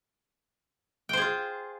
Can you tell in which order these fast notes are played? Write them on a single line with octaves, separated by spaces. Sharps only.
G5 C5 G#4 F4